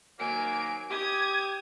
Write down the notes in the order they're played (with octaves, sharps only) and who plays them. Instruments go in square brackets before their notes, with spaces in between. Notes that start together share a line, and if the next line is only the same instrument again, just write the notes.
[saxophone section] D#3 F#3 A#3 [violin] G#5 D7
[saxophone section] G4 [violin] D#6 G#6